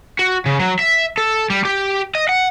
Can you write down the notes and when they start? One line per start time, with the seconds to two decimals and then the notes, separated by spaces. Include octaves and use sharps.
0.19 F#4
0.46 C#3
0.59 F#3
0.79 E5
1.18 A4
1.50 G3
1.65 G4
2.15 D#5
2.29 F#5